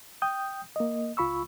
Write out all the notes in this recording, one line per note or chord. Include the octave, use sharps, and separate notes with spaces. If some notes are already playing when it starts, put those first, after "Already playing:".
G5 D#6 G6
A#3 D#5
C#2 F4 B5 C#6 E6